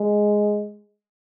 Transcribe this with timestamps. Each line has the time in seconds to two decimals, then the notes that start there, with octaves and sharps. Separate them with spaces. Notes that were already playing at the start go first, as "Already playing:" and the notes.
Already playing: G#3